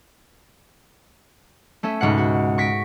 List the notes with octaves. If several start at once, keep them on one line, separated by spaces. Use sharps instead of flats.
A3 C#4 E5
C#2 G#2 B2 F#5
F#4
C#6 A#6 B6 D7